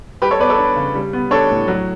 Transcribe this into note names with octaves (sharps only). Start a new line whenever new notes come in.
G3 G4 B4
A4 C#5
B3 B4 D5
A4 C#5
D4
C#3
G3
B3
D4 A4 C#5
A2
F#3